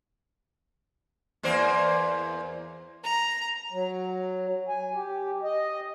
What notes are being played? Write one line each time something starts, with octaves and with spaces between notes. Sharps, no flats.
E2 A#3 C5
A#5
F#3
G#5
G4
D#5